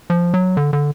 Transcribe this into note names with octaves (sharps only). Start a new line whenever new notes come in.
F3
F#3
D3
D3